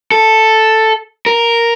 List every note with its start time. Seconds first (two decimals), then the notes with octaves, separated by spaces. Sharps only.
0.12 A4
1.26 A#4